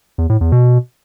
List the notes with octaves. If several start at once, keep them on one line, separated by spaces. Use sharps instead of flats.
E2
A2
E2
B2